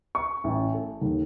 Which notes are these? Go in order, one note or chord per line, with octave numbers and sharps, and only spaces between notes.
C#6
A1
A4
D#2